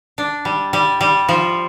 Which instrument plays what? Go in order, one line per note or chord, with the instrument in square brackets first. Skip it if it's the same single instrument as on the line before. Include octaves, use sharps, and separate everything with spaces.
[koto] D4
G3
G3
G3
F3